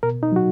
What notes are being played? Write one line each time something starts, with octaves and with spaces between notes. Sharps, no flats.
B2 A#4
D#4
F#3 F#4